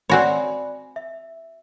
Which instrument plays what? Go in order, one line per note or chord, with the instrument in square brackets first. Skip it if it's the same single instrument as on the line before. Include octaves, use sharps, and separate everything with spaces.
[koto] C4 F#4 C#5 [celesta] D5 G#5 B5
[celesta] E5